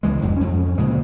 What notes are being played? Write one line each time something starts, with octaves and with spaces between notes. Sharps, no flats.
C#2 E3 G#3
F#1 F2 G#2 G3
F2 C#4
D2 A#2 C#3 G#3